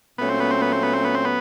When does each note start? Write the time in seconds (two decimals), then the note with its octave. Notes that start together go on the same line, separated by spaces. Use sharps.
0.18 A#2 F#3 A3 B3 C#4
0.29 C4
0.40 B3
0.51 C4
0.62 B3
0.72 C4
0.83 B3
0.94 C4
1.04 B3
1.15 C4
1.25 B3